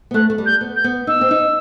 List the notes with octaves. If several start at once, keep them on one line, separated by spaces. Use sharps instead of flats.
B3
A3 F#6
A3
G3
G6
B3
G6
B3
D#4 E6
C4
D#4